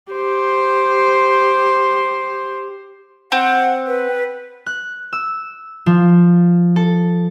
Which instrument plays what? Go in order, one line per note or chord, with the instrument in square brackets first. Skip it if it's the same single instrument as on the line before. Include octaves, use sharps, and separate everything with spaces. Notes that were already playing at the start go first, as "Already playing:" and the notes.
[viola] G4 C5
[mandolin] C4 [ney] F#5
[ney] B4
[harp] F#6
E6
F3
A4